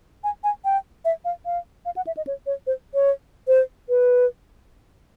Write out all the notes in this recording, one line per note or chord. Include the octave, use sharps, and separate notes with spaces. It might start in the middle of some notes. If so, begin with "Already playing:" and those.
G#5
G#5
G5
E5
F5
F5
F5
F#5
E5
D#5
C#5
C#5
C5
C#5
C5
B4